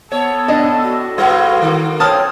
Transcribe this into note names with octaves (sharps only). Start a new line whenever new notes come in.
B3 A4 C#5
A2 D4 D#5
F#4
A2 G3 B3 F4
D#3 A#3
C4 C#5 A5 D#6 F6